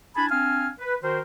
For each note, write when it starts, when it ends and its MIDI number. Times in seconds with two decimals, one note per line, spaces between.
0.16 0.29 62
0.16 0.29 64
0.16 0.29 80
0.16 0.29 81
0.16 0.29 83
0.31 0.68 60
0.31 0.68 62
0.31 0.68 77
0.31 0.68 80
0.31 0.68 89
0.79 0.96 71
1.02 1.20 51
1.02 1.20 66
1.02 1.20 70
1.02 1.20 72